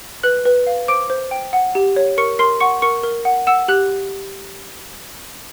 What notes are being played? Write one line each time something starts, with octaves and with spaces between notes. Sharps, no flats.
B4 F#6 F#7
B4
F5
C5 D6 D7
C5
G5
F#5
G4
C#5
A#4 C#6 C#7
A#4 C6 C7
F#5 C#6 C#7
A#4 C#6 C#7
A#4
F#5
F#5 E6 E7
G4 F#6 F#7